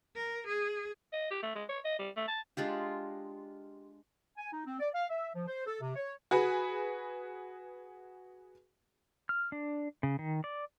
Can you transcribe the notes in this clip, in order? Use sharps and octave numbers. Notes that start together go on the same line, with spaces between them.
A#4
G#4
D#5
G4
A3
G#3
C#5
D#5
G3
A3
A5
G#3 D4 F4 G4
G#5
D#4
C4
D5
F5
E5
F3
C5
A4
C3
C#5
F#4 G#4 B4
F6
D4
C#3
D#3
D5